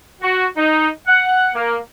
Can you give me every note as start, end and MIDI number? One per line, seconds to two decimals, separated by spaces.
0.22 0.45 66
0.57 0.88 63
1.07 1.50 78
1.55 1.78 58